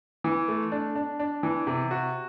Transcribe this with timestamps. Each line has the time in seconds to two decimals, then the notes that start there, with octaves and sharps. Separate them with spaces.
0.24 E3
0.48 A3
0.72 D4
0.95 D4
1.19 D4
1.43 E3
1.67 C3
1.91 F#4